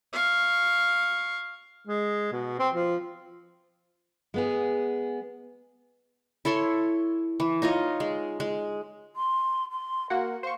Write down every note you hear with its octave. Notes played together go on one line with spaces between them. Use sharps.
F5 C#6
G#3
B2
C4
F3
G#3 B3 G#4
E4 A4 C#5 C6
E3
D#4 F4 C#5 D#5
G#3
G#3
C6
C6
A#3 F#4 A#4 F#5
C5 F5 C#6